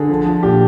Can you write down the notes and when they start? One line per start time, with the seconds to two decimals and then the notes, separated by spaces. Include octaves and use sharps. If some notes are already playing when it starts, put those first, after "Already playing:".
Already playing: D3 G#4
0.10 F3
0.26 F3
0.43 A#2 G4